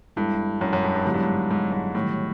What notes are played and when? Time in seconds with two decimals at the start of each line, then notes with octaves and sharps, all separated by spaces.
0.17 G2 G#3 B3 E4 A4
0.61 F#2
0.73 F#2
0.84 G2
0.95 G2
1.06 G#2 D3 F#3 B3 E4 G4
1.14 G2
1.23 G#2
1.51 G#2
1.72 G#2
1.94 A2 D#3 G3 C4